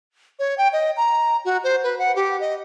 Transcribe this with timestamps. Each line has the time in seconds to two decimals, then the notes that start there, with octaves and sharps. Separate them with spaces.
0.39 C#5
0.58 G5
0.73 D#5
0.97 A#5
1.45 F#4
1.64 C5
1.84 B4
1.99 F#5
2.16 G4
2.40 D#5